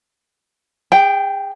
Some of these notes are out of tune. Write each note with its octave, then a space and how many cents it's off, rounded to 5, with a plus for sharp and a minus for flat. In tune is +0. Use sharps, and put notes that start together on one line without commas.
G#4 -35 G5 +0